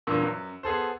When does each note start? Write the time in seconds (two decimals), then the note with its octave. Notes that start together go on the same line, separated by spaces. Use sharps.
0.07 E2 G2 A#2 E6
0.22 F#2
0.63 B3 G#4 A4 C5